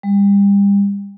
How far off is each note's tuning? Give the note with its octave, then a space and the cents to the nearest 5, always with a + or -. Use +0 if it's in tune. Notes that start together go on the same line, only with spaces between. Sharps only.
G3 +35